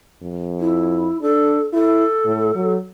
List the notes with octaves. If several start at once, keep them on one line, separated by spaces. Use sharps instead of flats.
F2
E4
D4 A4
E4 A4
A2
F#3